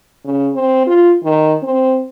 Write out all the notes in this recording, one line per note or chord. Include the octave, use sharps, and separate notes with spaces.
C#3
C4
F4
D#3
C4